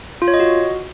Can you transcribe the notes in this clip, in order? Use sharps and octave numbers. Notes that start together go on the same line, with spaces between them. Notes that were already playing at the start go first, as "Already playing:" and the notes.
F4
C#5
D#5
F#4